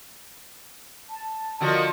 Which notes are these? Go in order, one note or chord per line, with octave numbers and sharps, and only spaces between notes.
A5
D3 F3 F#4 A#4 D#5